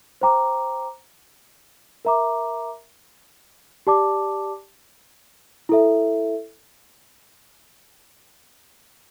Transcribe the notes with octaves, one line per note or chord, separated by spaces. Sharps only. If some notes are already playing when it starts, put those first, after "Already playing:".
C5 G5 A#5 D6
A#4 E5 A#5 D6
G4 D5 A5 D6
E4 A4 E5